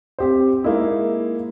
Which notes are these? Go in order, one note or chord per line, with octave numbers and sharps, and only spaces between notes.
C4 G4 C5
G#3 A#3 D#4 E4